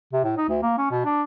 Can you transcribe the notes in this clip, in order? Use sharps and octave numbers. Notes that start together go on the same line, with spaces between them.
C3
A2
D#4
D2
A#3
C#4
B2
D4